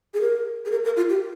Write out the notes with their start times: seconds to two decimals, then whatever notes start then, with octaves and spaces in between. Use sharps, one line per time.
0.14 G#4
0.21 A#4
0.65 G#4
0.71 A#4
0.84 A#4
0.97 F4
1.09 G4